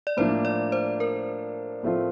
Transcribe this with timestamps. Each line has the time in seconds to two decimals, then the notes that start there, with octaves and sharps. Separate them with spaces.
0.07 D5
0.17 A2 F3 A#3 D4 C5
0.45 D5
0.72 C5
1.00 A#4
1.83 A2 F3 A3 C4 F4